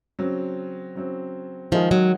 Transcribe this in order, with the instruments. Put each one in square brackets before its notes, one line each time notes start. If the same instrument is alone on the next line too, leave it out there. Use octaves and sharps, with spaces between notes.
[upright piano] C#3 F#3 C4
C#3 F#3 C4
[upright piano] D#3 G#3 D#4 G#4 [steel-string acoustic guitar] F3
[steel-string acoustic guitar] F#3